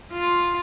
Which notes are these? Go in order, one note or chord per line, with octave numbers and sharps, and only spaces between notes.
F4